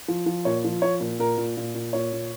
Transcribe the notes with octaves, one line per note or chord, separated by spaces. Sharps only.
F3
F3
A#2 C#5
F3
F3 C#5
A#2
A#2 A#4
A#2
A#2
A#2
A#2 C#5
A#2